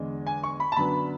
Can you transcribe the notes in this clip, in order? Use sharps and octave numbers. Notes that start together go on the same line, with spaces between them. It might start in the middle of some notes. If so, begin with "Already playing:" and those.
Already playing: E2 D3 G#3
G#5
C#6
B5
A5
F#2 D3 F#3 B3 D4 B5